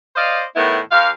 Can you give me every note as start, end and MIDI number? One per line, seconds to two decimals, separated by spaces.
0.16 0.42 72
0.16 0.42 74
0.16 0.42 75
0.16 0.42 77
0.56 0.79 45
0.56 0.79 51
0.56 0.79 59
0.56 0.79 63
0.56 0.79 64
0.92 1.10 39
0.92 1.10 67
0.92 1.10 77